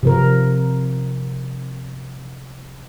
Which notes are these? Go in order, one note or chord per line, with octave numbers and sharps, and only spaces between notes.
C3 F3 A#4